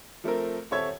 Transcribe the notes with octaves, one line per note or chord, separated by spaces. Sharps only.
F3 A3 C4 A#4
D#1 C4 A4 C#5 E5 G#6